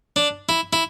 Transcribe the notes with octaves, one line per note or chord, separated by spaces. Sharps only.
D4
E4
E4